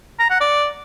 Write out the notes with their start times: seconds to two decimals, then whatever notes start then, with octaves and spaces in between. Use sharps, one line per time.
0.19 A#5
0.30 F#5
0.41 D5